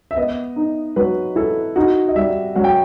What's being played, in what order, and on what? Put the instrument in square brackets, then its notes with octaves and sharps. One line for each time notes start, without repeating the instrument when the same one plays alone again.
[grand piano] E5
[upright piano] B3 [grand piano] D#5
[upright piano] D#4
[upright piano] F#3 [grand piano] B4
[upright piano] E4 [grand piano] A4
[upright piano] D#4 [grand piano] F#4
[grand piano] D#5
[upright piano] G3 [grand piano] E5
[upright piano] F#3 [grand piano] F#5
[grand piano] G5